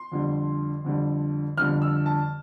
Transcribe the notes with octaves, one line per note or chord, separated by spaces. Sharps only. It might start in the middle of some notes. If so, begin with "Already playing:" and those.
Already playing: C6
F2 D3 G3
F2 D3 G3
F2 D3 G3 F6
E6
A5